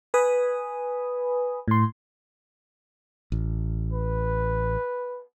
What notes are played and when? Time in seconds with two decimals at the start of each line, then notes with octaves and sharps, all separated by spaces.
0.14 B4 G#5 B5 D#6
1.68 A2 C6
3.32 A1
3.93 B4